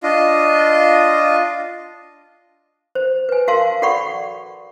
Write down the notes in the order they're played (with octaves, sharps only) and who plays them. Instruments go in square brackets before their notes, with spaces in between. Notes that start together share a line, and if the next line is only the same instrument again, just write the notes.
[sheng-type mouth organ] D4 F4 D#5
[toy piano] C5
B4 G#5
F#4 A#4 F5 A5 C6
F#4 A4 D5 F#5 B5 C#6